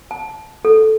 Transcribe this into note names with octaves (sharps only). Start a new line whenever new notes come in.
A5
A4